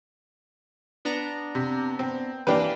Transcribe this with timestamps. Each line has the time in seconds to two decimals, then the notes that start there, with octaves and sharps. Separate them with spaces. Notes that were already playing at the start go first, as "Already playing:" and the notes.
1.05 B3 D4 A#5
1.55 C3
1.99 C4
2.47 E3 A#3 D4 G4 B4